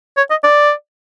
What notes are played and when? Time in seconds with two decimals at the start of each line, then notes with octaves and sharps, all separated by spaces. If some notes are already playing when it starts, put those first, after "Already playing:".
0.17 C#5
0.30 D#5
0.44 D5